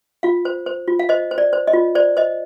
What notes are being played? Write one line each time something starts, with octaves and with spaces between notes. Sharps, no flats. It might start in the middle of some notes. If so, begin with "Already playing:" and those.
F4 F5
C5
C5
F4
F5
C5 D#5
C5
D5
C5
D#5
F4
C5 D5
C5 D#5